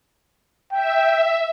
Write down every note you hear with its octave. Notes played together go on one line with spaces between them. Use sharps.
E5 G5